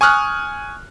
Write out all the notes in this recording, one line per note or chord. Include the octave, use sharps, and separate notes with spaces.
G#5 C#6 D#6 F6 F#6